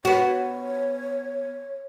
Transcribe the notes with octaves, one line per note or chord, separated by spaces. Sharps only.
B3 F#4 C#5